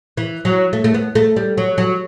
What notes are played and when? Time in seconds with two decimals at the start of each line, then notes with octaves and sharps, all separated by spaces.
0.17 E3
0.45 F#3
0.73 A3
0.84 A3
0.94 B3
1.15 A3
1.36 G3
1.57 F#3
1.78 F#3